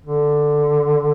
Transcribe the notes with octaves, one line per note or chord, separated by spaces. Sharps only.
D3